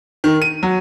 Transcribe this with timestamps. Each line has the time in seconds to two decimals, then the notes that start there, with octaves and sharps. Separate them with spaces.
0.24 D#3
0.42 D#7
0.63 F#3